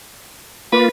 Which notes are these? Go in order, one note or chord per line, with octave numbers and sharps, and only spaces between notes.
A#3 F4 B4